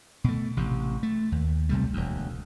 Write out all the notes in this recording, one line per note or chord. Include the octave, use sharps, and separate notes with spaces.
B2 A3
A1 C3
A3
D#2
B1 C3 G3 A3
E1 D2